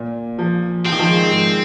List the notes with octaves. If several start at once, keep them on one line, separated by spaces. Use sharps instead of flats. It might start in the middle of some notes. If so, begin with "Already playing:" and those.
Already playing: A#2
F3
F3 C4
D#3
F3
G#3
G#2